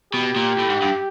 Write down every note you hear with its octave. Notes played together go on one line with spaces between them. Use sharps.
B2 G4
A#2
A2
G#2
G2